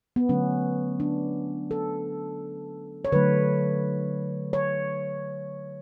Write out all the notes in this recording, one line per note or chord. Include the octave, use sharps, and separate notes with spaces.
B3
D3 F#3 A3 C#4
D4
A4
C#5
D3 F#3 A3 B4
C#5